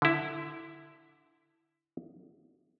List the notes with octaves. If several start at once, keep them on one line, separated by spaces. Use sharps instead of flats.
D3 E4